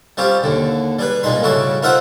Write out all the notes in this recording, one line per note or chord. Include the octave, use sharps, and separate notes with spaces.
G3 C4 C#4 F4 G4
D#2 D3
G3 G#4 B4
C2 A#2 G#3 D#4 C6
A2 C#3 G3 E4 F#4 A5
D#4 F4 A#4 C5 E5 F#5